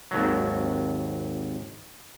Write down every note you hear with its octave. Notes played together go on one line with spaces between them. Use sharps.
G#1 D#2 F#3